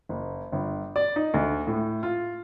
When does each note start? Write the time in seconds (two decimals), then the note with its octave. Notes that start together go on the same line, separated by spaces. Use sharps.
0.09 F#1
0.52 G1
0.96 D5
1.16 D#4
1.34 D2
1.67 A2
2.03 F4